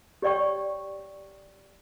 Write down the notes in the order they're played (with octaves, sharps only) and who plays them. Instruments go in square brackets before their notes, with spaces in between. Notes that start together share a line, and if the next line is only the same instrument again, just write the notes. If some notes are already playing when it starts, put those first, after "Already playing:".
[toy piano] G4 C#5 D5 G5 C#6